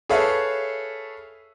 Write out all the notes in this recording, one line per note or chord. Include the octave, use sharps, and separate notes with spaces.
G#4 A4 B4 C#5 E5 F5